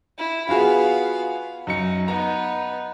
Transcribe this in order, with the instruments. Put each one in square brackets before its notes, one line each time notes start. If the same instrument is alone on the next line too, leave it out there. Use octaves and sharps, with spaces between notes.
[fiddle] E4
[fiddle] B3 F5 [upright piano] F4 F#4 G#4
[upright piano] F#2 C#7 [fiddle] D#4
[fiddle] B3 D#4 [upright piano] A#5